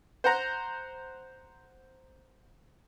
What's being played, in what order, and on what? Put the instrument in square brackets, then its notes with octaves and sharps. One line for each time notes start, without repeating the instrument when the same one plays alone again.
[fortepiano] C5 F#5 A#5